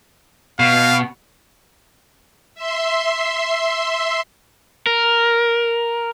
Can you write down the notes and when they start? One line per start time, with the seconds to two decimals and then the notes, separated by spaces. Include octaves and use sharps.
0.59 B2 F5
2.55 E5 C6
4.86 A#4